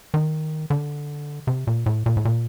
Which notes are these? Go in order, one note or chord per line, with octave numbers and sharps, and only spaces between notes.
D#3
D3
C3
A#2
A2
A#2
A2
A#2